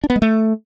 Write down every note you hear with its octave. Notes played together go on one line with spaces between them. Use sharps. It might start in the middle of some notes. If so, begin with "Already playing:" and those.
D4
B3
G#3
A3